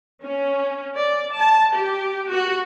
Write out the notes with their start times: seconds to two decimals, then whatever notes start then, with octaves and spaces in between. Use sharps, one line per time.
0.22 C#4
0.96 D5
1.33 A5
1.73 G4
2.32 F#4